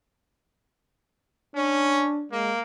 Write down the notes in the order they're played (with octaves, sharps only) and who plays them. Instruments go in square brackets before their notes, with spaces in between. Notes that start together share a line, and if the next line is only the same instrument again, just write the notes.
[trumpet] C#4 [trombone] D4
[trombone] G#3 [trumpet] A#3